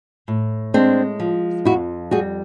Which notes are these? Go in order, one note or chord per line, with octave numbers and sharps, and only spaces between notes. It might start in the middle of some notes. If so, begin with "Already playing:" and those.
A2
G#3 C4 D4
F3
F2 E4 F#4
G3 F#4 G#4